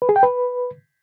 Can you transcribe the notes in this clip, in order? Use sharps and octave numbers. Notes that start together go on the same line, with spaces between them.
B4
G#4
G5
B4